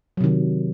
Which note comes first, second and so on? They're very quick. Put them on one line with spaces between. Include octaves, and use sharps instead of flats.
F#3 C3 D#3